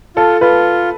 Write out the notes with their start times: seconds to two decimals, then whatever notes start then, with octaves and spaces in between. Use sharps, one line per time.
0.16 F4 A4
0.41 F4 B4